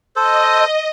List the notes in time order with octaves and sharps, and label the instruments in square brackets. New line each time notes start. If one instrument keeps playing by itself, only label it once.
[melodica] A4 C5 [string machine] D#5